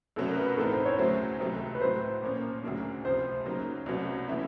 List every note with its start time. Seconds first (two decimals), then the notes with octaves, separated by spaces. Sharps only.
0.16 C2 B2 F#3 A3 C#4 A4
0.27 A#4
0.37 B4
0.48 A#4
0.57 A2 E3 A3 C4 D#4 A4
0.72 C5
0.85 C#5
0.98 D2 C#3 F#3 A3 C5
1.40 C#2 C3 D#3 F#3 A3
1.75 B4
1.81 A2 F#3 A3 C5
2.22 A#2 F3 A#3 C#4
2.63 D2 C#3 F#3 A#3 D4
3.04 C#2 C3 F3 C5
3.46 C#3 F#3 A#3 D#4
3.86 C2 B2 F#3 A3 C#4
4.28 E3 A3 C#4 E4